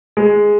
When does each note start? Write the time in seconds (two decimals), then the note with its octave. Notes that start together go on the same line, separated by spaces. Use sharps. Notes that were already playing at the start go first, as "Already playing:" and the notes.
0.17 G#3